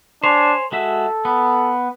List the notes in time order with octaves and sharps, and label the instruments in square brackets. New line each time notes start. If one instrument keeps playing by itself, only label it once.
[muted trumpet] D4 [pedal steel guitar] C5 C#5 G#5
[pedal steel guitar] G#3 F#4 E5 [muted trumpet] A4
[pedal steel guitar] B3